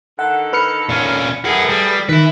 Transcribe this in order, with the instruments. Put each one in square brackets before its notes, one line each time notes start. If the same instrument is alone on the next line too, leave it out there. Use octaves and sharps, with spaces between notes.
[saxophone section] D3 D#3 A4 [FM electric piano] F#5
[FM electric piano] B4 F6 C#7
[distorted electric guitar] A#2 C#4
[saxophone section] A2 G#4 [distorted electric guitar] A#4 F#5
[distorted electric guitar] G3
[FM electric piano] D#3 [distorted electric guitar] E4 B4